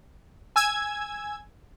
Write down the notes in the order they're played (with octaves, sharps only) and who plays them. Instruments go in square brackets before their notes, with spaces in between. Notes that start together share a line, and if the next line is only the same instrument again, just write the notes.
[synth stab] G#5 E6 G#6